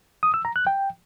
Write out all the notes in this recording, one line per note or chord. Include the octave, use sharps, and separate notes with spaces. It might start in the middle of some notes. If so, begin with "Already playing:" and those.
D#6
E6
A#5
F#6
G5